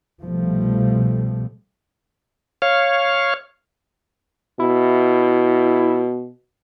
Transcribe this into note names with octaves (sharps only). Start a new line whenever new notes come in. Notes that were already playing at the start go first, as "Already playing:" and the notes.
C2 B2 F3 G3 A3
C#5 F5
B2 E4